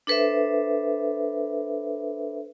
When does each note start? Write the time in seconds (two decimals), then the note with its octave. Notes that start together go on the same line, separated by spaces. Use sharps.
0.07 D4 A4 B4 C5 E5